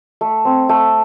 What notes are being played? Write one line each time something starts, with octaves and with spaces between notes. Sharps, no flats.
A3
C4
A3